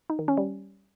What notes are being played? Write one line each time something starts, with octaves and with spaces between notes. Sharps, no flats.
D#4
D#3
C#4
G3